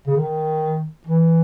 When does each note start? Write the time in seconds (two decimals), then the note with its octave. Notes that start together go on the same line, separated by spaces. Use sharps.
0.07 C#3
0.17 D#3
1.07 E3